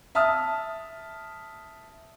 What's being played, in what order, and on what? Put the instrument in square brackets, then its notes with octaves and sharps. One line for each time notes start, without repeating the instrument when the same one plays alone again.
[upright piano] E5 A5 D#6 F6